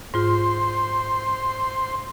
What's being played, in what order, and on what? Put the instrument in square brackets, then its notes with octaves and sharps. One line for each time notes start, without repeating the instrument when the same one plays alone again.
[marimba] G#2 F4 [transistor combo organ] C5 C6